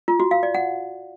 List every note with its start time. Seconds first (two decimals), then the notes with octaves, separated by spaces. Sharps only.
0.08 F4
0.20 F#4
0.31 F5
0.43 D5
0.55 F#5